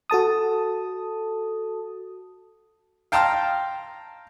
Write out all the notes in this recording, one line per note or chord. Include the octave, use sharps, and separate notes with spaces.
F#4 A4 A5 D#6
F5 G5 A5 A#5 C6 F6